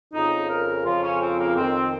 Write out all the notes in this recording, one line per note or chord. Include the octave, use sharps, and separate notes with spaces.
F2 C#3 F3 D#4
A#4
F2 C#3 F3 F4
C#4
C4
A#3
F2 D#3 C4